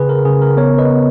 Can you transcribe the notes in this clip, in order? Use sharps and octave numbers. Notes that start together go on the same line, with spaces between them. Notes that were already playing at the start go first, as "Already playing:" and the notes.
Already playing: C#3 G#4 B4
A#4
C#3 G#4
A#4
B3 A#4 C#5
B4 D#5
B3